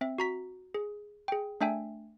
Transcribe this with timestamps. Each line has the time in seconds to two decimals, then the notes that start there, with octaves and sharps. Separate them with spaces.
0.01 C4 E5
0.18 F#4 A#5 B6
0.74 G#4
1.28 G#4 G5
1.61 A3 D4 E5 G5 G#5